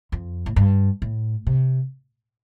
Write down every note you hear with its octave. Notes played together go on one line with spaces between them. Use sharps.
F2
A2
G2
A2
C3